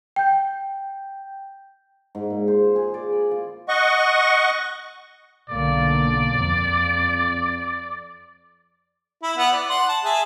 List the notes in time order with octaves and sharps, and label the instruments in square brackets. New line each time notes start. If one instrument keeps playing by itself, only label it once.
[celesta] G5 G6
[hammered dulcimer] G#2
A#2
C5
G#4
D5
B5
F4
[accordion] D#5 F#5 C#6
[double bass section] B1 D3 A#3 [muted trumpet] D5
[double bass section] F2
[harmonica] E4
B3 E4 F#5
D5
F#5 C6
A5
G#4 E5 A5